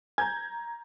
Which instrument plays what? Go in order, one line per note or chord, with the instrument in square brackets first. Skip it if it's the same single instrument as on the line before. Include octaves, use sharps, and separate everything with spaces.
[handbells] G#5 [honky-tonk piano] A#5 G6 G#6